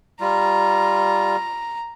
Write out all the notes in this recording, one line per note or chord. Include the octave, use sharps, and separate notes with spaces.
G3 F4 A#5